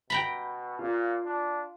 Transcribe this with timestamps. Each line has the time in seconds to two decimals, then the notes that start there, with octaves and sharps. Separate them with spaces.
0.10 B2 G5 A#5 B5
0.79 A#2 F4
1.25 D4